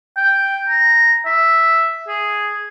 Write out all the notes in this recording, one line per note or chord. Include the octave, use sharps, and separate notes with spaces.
G5
A#5
E5
G#4